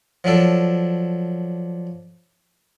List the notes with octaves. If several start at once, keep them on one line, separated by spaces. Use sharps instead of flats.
F3 F#3 D4 A4